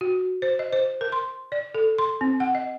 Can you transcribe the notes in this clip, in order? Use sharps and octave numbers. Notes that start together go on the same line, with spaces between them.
F#4
C5
D#5
C5
A#4
C6
D5
A4
C6
C4
F#5
D#5